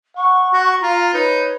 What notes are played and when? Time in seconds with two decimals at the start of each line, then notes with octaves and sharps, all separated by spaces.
0.16 F#5 C#6
0.53 F#4
0.82 F4 F5 A#5
1.14 D#4 B4 C#5